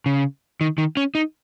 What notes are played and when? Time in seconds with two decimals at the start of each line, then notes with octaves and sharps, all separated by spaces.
0.06 C#3
0.61 D#3
0.78 D#3
0.97 C#4
1.15 D#4